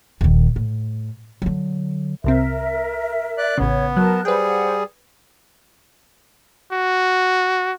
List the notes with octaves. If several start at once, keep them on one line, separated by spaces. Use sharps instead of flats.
D#1 D#3
A2
D3 F#3
C2 C3 C4 A#4 E5
D5 F#6
A1 C#3 B3 C#5
F#3 A#4 A5 F#6
G3 G#4 B4 C5 F#5 G5
F#4